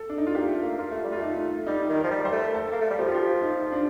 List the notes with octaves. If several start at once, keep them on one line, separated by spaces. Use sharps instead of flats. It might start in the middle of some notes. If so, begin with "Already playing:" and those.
Already playing: A4
D4
D#4
F4
A#3 G4
A3
A#3
A#3 F4
A3
G3
F4
A3 D#4
G3 D#4
D#3
A#4
F3
G3
G3 C5
A3
A4
A#3
A3
G3
F3 G4
F4
G4
D#4
D4